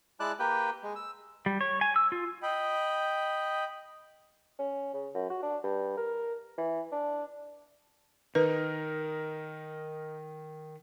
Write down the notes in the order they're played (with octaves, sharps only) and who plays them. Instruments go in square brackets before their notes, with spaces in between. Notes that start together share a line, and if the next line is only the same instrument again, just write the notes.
[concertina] G#3 E4 D5 A5 F#6
A#3 G4 B4 G5
G#3
E6
[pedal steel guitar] G3
C#5
G#5
E6
F4
[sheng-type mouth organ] D#5 G5 B5
[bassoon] C#4
C#3
F#2
F#4
D4
G2
A#4
E3
D4
[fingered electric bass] D#3 [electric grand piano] D#4 A#4 [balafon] B4